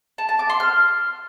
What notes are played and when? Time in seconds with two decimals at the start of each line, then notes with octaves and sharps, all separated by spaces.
0.18 A5
0.29 A5
0.39 D6
0.50 C6
0.60 F6